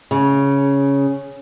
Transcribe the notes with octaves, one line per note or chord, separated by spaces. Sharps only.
C#3